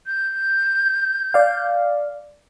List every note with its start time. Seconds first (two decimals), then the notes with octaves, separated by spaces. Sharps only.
0.07 G6
1.34 D5 F5